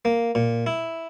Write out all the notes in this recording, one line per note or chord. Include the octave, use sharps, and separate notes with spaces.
A#3
A#2
E4